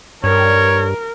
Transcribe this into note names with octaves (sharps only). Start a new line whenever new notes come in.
G2 A#4 C#5